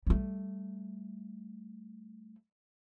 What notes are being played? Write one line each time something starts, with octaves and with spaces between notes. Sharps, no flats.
G3 A3